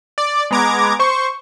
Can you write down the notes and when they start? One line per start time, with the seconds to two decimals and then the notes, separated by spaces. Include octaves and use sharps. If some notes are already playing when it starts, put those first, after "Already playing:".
0.18 D5
0.51 G#3 B3 A#5 D6 G#6
0.99 C5 C#6